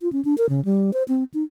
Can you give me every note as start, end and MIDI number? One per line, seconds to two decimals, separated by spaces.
0.01 0.11 65
0.12 0.23 61
0.25 0.35 62
0.38 0.49 70
0.49 0.63 49
0.65 0.93 55
0.93 1.03 72
1.08 1.24 60
1.34 1.43 63